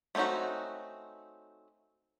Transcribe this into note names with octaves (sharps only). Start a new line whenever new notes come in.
A3 C4 C#4 D#4 F#4